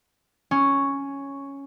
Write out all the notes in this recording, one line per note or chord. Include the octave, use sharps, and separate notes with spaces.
C#4